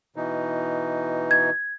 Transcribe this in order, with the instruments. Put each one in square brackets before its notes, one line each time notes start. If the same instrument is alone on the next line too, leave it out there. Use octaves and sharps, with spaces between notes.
[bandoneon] B2 E3 D#4
[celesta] G#6